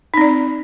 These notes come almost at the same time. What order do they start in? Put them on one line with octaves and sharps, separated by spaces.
D#4 C4 D5